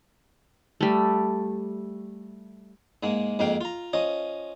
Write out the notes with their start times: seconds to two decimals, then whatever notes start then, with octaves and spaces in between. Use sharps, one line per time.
0.81 G3 A3
3.03 G#2 G#3 A#3
3.39 F2 G#2 A#3 F5 G5
3.61 F4 A#5
3.93 F3 C#4 D#5